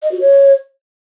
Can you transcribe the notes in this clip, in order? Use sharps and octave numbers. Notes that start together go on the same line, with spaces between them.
D#5
F#4
C#5